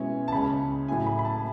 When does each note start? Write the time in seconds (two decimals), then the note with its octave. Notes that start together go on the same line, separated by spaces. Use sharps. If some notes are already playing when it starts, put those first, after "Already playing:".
Already playing: B2 G#3 C#4 E4 G#5
0.28 A5
0.32 C#2 C#3 G#3 C#4 B5
0.88 A2 F#3 A3 E4 G#5
1.06 B5
1.19 B5
1.25 A5